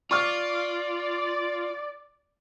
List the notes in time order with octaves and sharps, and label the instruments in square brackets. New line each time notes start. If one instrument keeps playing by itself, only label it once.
[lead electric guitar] F4 [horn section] D5 [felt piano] C#6 F6